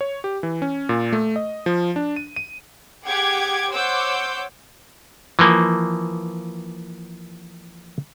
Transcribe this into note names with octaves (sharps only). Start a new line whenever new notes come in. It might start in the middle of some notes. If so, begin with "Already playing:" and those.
C#5
G4
E3
C#4
A#2
A3
D#5
F3
D4
D#7
D#7
G4 G#4 F#5 G5 D6 G#6
C5 C#5 F#5 D6 E6 G6
E3 F3 A#3